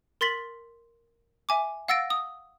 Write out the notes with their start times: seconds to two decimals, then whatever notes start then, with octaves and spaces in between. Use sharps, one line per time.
0.21 A#4 C6 A6 B6 F#7
1.49 E5 G#5 D6
1.88 F5 F#5 E6 A6 A#6 D7
2.10 D#6